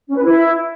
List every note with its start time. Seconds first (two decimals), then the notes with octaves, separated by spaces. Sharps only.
0.08 C#4
0.16 B4
0.23 E4